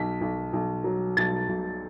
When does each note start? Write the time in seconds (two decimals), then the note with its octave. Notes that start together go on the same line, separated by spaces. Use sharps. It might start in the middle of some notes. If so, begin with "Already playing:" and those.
Already playing: B1 B6
0.21 B1
0.53 B1
0.84 F#3
1.17 B1 A6
1.49 B1